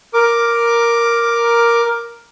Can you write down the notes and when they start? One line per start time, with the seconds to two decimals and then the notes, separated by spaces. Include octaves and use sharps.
0.14 A#4 D6